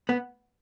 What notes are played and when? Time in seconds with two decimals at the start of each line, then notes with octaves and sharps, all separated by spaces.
0.09 B3